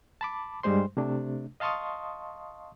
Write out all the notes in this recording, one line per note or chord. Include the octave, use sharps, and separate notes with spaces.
A5 B5 D6
G2 G3 G#3 C5 C6
C3 A3 D4
D#5 F5 A5 C6 C#6 D#6